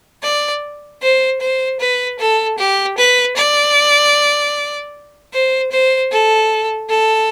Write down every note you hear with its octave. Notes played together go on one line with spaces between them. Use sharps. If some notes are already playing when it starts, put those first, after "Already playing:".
D5
C5
C5
B4
A4
G4
B4
D5
C5
C5
A4
A4